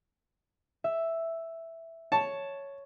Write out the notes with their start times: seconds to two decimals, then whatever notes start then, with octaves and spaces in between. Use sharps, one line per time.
0.84 E5
2.12 C#5 A5